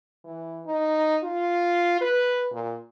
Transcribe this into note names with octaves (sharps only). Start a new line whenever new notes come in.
E3
D#4
F4
B4
A#2